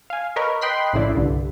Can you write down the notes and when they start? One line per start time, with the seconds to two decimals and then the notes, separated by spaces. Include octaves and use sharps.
0.10 F5 G#5
0.36 A#4 B4 C#5 D#5
0.61 D#5 G5 B5 C6 F#6 B6
0.93 A#1 A2 C#3 E4 D5
1.15 C2 G2 D3